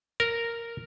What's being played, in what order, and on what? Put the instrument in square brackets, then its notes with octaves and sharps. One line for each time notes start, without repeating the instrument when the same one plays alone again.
[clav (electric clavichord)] A#4